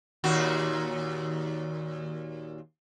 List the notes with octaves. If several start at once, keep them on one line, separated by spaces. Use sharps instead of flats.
D#2 A#2 F#4